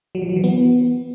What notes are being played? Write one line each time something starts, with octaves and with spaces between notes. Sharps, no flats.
F#3
F3
F#3
E3
B3